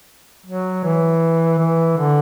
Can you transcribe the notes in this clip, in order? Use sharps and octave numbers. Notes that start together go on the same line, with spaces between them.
F#3
E3
E3
D3